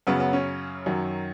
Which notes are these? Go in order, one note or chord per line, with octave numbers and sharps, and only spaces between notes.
F#2 C#3 F#3 B3
B3
C#4
F#2 D#3 F#3